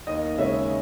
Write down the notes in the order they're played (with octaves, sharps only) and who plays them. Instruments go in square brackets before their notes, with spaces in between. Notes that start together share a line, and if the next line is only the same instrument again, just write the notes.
[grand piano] D#2 D#5
C#3 G#3 C#4 E5